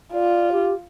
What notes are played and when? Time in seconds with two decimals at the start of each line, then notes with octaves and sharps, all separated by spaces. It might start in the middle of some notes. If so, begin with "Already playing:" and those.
0.14 F4 D5
0.52 G4